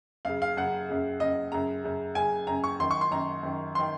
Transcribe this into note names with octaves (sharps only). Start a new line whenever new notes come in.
F#2 C#3 F5
F5
F#2 C#3 F#5
F#2 C#3
F#2 C#3 D#5
F#2 C#3 A#5
F#2 C#3
F#2 C#3 G#5
F#2 C#3 A#5
C#6
F#2 D#3 C6
C#6
C6
F#2 D#3 A#5
F#2 D#3
D#3 C6